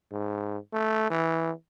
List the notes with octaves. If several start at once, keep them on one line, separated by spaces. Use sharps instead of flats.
G#2
A3
E3